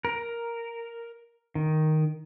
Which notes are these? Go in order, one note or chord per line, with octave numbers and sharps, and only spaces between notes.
A#4
D#3